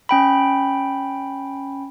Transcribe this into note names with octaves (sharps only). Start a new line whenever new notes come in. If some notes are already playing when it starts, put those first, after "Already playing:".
C#4 G5 B5